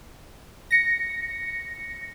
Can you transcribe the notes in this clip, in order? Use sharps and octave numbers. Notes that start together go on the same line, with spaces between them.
A#6 C#7